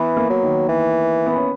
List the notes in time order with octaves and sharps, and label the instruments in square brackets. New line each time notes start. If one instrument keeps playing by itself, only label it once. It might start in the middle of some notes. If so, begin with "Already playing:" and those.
Already playing: [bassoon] E3 [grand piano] B3
[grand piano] A#3
[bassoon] F#3
[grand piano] D#3
[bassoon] E3
[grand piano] B3
C#4